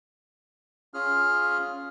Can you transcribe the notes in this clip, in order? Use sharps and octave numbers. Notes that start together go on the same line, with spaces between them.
C#4 F4 G#4 F6